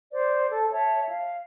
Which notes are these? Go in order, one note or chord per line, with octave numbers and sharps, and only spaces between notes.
C5 D5
A4 A5
C#5 E5 A5
F5